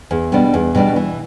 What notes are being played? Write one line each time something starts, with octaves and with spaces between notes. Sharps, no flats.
E2
B2 G3 B3 D4
E2
B2 G3 B3 D4
E3